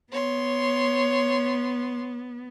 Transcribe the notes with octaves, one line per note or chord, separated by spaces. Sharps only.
B3 C#5 C6